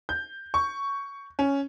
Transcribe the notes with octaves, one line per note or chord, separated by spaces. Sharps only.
G6
C#6
C#4